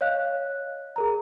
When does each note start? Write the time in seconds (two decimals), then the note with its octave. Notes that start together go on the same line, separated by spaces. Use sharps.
0.01 C#5 D#5 F5 F#6
0.96 G#4 A#4 A#5